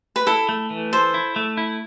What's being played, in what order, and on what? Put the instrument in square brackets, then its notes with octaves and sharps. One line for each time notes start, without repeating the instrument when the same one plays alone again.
[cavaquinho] B4
[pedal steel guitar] E4 [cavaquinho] A4
[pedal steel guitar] A3
E3
[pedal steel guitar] A4 [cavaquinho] C5
[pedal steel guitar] E4
A3
E4